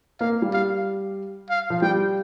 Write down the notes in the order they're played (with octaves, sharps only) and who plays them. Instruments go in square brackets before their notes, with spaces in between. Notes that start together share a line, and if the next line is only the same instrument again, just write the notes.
[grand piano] A#3 [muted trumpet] F5
[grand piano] G3
[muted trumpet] F5
F5
[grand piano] F3
[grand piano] G3 [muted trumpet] G5